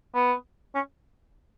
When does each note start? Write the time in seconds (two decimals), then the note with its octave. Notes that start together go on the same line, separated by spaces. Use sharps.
0.14 B3
0.75 C#4